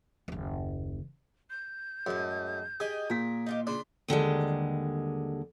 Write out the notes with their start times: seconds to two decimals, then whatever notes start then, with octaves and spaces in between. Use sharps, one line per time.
0.28 F#1 D#2
1.50 G6
2.06 F#2 A2 G#3
2.80 G4 G#4 D#5
3.10 A#2 A#4 B6
3.46 D#4 F4 G4
3.67 C#3 D4 C6
4.08 D#2 D3 G3 G#3